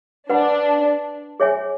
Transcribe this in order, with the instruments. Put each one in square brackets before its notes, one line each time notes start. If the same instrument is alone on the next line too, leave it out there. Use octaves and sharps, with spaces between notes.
[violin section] D4 [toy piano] B4 F#5 B5
[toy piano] G#4 C#5 E5 G#5